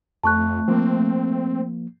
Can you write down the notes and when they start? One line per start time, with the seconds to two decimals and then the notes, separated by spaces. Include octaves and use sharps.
0.24 F2 A3 A5 C#6 F#6
0.68 F3 A#3 C4